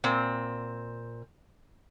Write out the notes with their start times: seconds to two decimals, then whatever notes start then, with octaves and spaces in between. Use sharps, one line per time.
0.04 A#2 C4